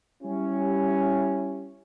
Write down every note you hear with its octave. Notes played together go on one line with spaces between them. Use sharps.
G3 C#4 E4 G4